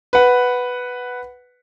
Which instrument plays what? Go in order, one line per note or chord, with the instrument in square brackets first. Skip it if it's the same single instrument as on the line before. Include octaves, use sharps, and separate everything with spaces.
[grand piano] B4 F#5